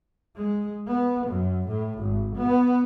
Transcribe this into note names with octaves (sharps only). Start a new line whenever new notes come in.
G#3
B3
F#2
A2
G#1
B3